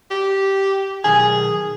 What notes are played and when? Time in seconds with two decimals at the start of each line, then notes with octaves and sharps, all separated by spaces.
0.11 G4
1.04 B1 D#3 G#4 G#5